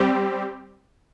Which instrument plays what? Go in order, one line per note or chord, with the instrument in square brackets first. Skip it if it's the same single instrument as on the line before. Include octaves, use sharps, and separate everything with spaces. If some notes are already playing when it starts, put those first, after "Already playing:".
Already playing: [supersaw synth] G3 C4 G4